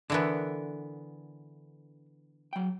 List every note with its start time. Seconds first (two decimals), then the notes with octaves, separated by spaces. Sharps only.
0.10 D3 E3 B3 D4 A#4
2.53 F#3 G5